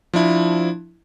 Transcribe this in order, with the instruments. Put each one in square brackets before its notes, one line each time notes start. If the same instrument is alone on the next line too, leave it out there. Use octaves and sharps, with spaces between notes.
[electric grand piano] F3 D4 E4